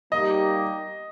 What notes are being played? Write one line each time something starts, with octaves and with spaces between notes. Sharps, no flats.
G3 A#3 D#4 G4 D#5